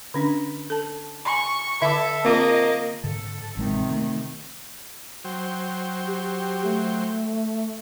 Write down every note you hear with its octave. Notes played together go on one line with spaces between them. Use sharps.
D3 C#4 D4
A4 A5
G#5 B5 C#6
D3 A4 E5 B5 D6
A#3 C4 F4 D#5
G#2 D3 A4
A1 C3 D#3 G#3 C4
A3
F#3 C5 G5
G4
A3